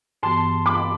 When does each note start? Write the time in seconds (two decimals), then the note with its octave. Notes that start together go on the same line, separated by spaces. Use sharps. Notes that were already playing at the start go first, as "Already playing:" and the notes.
0.23 G2 E3 B3 F#4 A5 C6
0.66 B5 D6